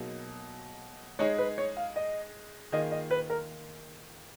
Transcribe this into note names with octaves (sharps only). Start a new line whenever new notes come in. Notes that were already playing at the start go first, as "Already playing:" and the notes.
Already playing: B2 F#3 A#3 D#4 G#4
G#3 D#4 G#4 C#5
B4
C#5
F5
D#5
D#3 A#3 F4 G#4 D#5
D#5
B4
A#4